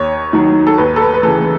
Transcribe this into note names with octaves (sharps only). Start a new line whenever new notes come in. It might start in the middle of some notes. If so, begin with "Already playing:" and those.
Already playing: D#2 C#5
D#3 F#3
A4
D#2 B4
A4
B4
B4
C#3 E3 A4